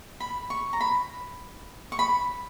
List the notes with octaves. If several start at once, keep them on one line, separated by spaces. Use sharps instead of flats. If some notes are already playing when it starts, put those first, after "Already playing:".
B5
C#6
A#5
B5
C#6
B5